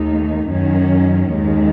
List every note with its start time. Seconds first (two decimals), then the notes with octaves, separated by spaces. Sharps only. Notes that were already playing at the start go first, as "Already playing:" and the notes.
Already playing: D#2 D#3 A3 D#4
0.48 F#2 D#3 F#3 C#4
1.29 D#2 D#3 G#3